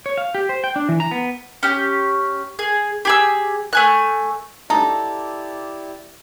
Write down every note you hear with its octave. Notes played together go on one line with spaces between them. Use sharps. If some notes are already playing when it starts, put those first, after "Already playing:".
C#5
F5
G4
C5
G5
D4
E3
A#5
B3
C#4 G4
G#4
G4 G#4 E6
A3 G#5 F#6
D#4 E4 G4 A4 D5 A#5